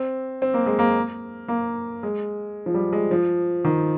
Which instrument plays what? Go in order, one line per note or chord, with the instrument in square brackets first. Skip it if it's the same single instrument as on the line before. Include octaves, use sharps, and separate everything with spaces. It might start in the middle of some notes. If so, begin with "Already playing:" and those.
Already playing: [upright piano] C4
C4
A#3
G#3
A#3
A#3
G#3
F3
G3
G#3
F3
D#3